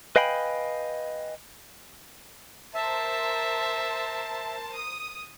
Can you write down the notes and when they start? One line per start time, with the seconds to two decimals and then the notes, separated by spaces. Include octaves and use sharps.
0.16 B4 D#5 F5 G5 G#5 B5
2.74 A#4 C5 E5 A5
4.75 D#6